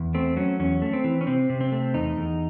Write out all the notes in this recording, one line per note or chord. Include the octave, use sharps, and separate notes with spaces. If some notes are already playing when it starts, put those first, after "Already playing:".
Already playing: E2
A3 C4
F#3 C#4
E2 C#4
A3
C4
E3
C#4
C3 C4
C3
C4
A3
E2 D#4
E2